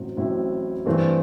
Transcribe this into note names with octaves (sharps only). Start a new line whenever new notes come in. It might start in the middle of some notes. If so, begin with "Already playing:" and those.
Already playing: A1 A2 F#3 C4
A1 A2 F#3 C4 E4
G2 E3 A3 C4